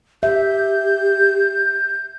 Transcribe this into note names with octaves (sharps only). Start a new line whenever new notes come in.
G4 E5 G6